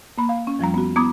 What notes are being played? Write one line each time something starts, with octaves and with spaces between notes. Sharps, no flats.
A#3 B5
F5
C#4
F2 F3 G3 A#5
B3 F#4
B3 E4 A#5 D6 D#6 G#6